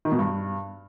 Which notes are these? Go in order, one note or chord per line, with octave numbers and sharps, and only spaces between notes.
D#3
B2
G2